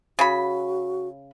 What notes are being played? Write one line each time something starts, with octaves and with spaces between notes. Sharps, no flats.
C#3 F#4 B5